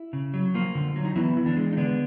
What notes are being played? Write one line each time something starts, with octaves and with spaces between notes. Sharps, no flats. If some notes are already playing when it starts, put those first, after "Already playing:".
Already playing: E4
C#3
F#3
F3 A#3 F4
D3
F#3
D#4
E3 B3 E4
E3
D3 D4
G#3
D#4
D3 B3 D4